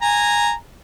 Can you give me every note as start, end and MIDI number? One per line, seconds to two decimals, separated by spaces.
0.02 0.52 80
0.02 0.52 82